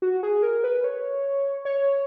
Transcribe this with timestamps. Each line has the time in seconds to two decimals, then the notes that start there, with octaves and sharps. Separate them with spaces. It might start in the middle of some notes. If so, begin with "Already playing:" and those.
0.02 F#4
0.23 G#4
0.43 A#4
0.64 B4
0.84 C#5
1.65 C#5